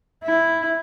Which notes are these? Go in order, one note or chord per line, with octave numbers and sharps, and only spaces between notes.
E4